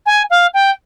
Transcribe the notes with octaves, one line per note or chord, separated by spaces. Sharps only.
G#5
F5
G5